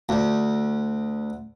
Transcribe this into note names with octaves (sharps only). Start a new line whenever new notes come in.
D2